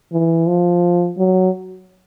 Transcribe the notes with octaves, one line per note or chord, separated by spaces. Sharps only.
E3
F3
F#3